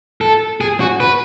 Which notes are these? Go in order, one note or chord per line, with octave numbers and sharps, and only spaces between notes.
A4
G#4
F#4
B4